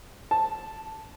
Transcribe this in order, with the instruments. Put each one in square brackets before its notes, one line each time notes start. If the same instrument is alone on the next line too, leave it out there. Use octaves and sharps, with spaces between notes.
[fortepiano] A5